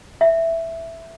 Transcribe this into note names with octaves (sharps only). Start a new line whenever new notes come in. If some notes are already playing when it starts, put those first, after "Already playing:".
E5